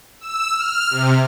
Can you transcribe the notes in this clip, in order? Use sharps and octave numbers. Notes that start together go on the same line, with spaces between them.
E6
F6
C3